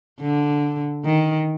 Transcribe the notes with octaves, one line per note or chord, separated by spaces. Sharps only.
D3
D#3